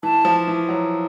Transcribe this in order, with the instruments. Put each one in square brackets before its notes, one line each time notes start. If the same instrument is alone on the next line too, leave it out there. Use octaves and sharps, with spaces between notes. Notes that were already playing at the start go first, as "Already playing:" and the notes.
[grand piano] E3 [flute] A5
[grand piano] F3
E3
F#3